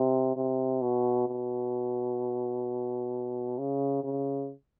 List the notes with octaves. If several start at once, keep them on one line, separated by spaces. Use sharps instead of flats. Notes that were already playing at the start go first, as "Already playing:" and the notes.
Already playing: C3
C3
B2
B2
C#3
C#3